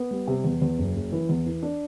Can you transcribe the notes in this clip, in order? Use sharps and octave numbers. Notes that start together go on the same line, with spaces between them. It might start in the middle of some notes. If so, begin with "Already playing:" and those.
Already playing: B3
G3
C3
E2
E2
F#1
F#1
E3
E2
E3
D4